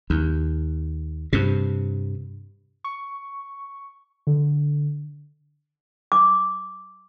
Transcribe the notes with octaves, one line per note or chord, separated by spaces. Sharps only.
D#2
G2 C3
C#6
D3
D6